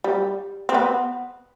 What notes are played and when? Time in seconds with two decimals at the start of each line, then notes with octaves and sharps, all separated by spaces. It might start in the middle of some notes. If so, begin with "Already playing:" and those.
0.04 G3
0.69 C4
0.74 B3